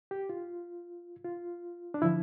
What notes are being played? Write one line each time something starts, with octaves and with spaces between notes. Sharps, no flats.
G4
F4
F4
D4
D3 F3 E4